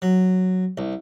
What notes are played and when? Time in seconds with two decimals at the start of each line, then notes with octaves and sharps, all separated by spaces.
0.02 F#3
0.78 C2